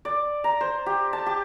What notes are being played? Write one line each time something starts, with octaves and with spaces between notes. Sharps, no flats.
D5
A#5
C5
G4
A5
G4